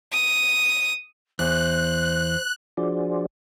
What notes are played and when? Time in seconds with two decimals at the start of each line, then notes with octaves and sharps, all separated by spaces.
0.13 D#6
1.39 E2 C5 F#6
2.77 F3 D4 F#4 G#4 C5 D5